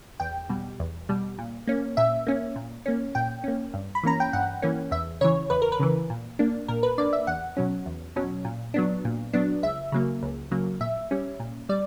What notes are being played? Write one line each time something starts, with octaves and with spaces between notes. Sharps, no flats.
E2 G5
B2 G3
E2
B2 G3
A#2
A#3 C#4
A#2 E5
A#3 C#4
A#2
A#3 C#4
A#2 G5
A#3 C#4
G2
B5
E3 A#3 C#4 A#5
G5
G2 F#5
E3 A#3 C#4
E2 E5
C#3 E3 C#5
E2 B4
A#4
B4
C#3 E3
A#2
A#3 D4
A#2 A#4
B4
A#3 D4 D5
E5
E2 F#5
B2 F#3 C#4
E2
B2 F#3 C#4
A#2
F#3 B3 D4
A#2
F#3 B3 D4
C#2 E5
C#3 F#3 A#3
C#2
C#3 F#3 A#3
A#2 E5
G3 C#4
A#2
G3 D5